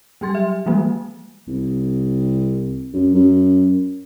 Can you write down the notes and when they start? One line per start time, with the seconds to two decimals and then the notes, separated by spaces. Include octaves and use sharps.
0.21 F#3 G3 G4 C6 A6
0.35 E5
0.66 E3 F3 G3 G#3 A#3
1.47 C2
2.93 F#2
3.14 F#2